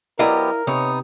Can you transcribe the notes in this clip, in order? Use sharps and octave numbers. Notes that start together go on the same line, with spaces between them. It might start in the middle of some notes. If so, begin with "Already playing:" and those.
F#3 B3 E4 G4 A#4 D5 D#5 F5
C3 B3 D#4 C#5 D#6